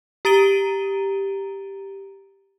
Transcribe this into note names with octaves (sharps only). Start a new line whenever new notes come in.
G4 A#5 A6 D7 D#7 G7